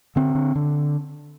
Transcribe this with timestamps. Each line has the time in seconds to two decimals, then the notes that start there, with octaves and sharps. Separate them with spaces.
0.16 D3 C4
0.35 D3
0.55 D3